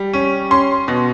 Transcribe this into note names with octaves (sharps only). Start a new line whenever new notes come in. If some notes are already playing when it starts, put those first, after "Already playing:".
Already playing: G3
C#4
C#4 C6
B2